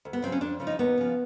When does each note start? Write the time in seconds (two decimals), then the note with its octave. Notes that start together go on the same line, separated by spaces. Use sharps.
0.05 D2
0.13 B3
0.22 C#3 F#3 C4
0.32 C#4
0.41 F2 D4
0.60 C#3 F3
0.67 D#4
0.79 D#2 B3
0.98 C#3 F3